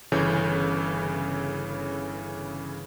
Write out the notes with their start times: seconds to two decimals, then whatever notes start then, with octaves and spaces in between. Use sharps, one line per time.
0.12 G1 C#3 E3 A4 C#5 G6